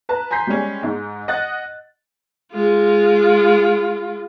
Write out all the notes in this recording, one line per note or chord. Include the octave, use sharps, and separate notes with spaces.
B4 A5 A#5
G#5 A#5 C6 G6 B6 C7
G3 G#3 C#4
G#2 G#3
D#5 F#5 F#6 A6
G#3 F4